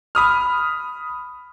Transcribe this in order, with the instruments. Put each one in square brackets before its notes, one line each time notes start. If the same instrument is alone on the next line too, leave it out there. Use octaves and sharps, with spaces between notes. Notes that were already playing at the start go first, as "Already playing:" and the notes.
[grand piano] B5 D#6 F6